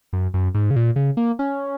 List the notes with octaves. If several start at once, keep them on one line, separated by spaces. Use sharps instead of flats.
F#2
F#2
G#2
C#3
A#2
C#3
A#3
C#4